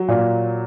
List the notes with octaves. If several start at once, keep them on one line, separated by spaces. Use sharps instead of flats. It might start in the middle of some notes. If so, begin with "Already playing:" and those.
Already playing: F#3
A#2